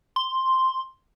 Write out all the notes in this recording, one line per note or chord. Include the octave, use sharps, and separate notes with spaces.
C6